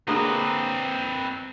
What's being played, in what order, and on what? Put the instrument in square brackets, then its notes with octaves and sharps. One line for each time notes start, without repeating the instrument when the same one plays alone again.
[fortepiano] D3 G#3 A#3 [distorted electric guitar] C4 B4 [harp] A#5 D#6 A#6